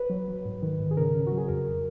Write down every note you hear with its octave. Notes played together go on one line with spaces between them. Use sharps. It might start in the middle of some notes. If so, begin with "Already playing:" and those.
Already playing: B4
F#3
F#3
G#2
D#3
G#2
G#4
C#3 A#4
C#3
F#4
F#3
G#4
F2 A#4